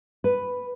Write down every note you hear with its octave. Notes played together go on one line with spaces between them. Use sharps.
B4